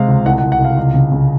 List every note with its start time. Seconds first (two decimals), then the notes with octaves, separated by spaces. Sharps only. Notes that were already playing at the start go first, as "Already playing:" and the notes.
Already playing: C3 G#3 F5
0.08 C#2
0.25 C2 F#5
0.38 F#5
0.43 C2
0.52 F#5
0.60 C2 F5
0.77 C#2
0.94 C#3
1.12 C#3